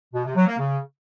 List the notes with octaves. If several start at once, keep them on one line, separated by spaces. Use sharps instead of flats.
B2
C3
F#3
A#3
C#3